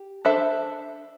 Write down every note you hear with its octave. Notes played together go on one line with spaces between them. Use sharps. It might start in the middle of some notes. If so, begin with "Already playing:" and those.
Already playing: G4
D4 A4 C5 E5